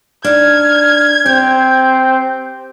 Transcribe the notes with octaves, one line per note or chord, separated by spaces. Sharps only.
D4 D#4 F6 G#6
C4 G4 G6